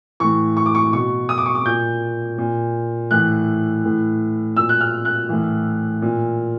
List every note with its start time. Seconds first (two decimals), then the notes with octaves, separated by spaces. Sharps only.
0.20 A2 E3 C#6
0.57 C#6
0.66 D6
0.75 C#6
0.92 B2 C#6
1.29 D#6
1.38 D6
1.46 C#6
1.55 D6
1.65 A#2 G6
2.38 A#2
3.11 A2 E3 F#6
3.84 A2 E3
4.56 A#2 E6
4.69 F#6
4.81 F6
5.05 F#6
5.29 A2 E3
6.02 A#2